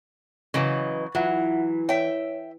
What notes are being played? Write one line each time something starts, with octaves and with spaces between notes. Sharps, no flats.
C#3 E3 F#3 B4 D#5 C#6
E3 F#3 F4 E5 F#5
C#5 E5 G5